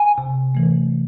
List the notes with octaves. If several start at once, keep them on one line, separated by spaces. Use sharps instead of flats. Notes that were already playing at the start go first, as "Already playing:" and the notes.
Already playing: G#5
C3
E3 A3